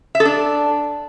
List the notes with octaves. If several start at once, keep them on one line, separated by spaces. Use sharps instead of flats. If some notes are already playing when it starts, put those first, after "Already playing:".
E5
A4
D4